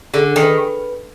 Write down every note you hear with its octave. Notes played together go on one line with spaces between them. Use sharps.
D3 G#4
D#3
B4